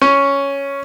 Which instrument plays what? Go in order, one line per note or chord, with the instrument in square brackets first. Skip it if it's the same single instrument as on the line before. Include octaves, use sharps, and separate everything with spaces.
[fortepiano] C#4